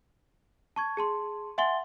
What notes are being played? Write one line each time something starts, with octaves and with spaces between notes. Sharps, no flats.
A5 C#6 G#6
G#4 A5 C6
E5 F#5 G#5 C6 A6 G7